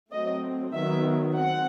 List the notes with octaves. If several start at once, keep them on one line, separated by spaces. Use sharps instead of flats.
F#3 A3 C4 D#5
D#3 F#3 B3 E5
C4 F#5